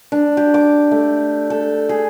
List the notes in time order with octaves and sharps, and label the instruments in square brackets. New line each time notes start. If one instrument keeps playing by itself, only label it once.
[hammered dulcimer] D4
G4
D6
A3
A4
G#4